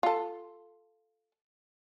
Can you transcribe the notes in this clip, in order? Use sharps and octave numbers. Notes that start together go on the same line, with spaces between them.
F4 A4